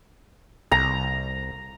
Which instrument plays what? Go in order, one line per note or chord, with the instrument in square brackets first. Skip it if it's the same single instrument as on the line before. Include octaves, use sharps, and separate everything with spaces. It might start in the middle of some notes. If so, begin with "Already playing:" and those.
[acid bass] C2 [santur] A#5